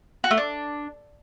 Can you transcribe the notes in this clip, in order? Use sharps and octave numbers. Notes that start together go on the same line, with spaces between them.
F#4
A3
D4